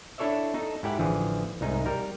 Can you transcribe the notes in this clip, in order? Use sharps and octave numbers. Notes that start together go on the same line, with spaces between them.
D4 E4 A4 C#5 D5 E5
D#4 A4
G#2 E4 G4 F#5
A1 D3 E3 F3 G#4
C2 G#2 D#4
G3 A#4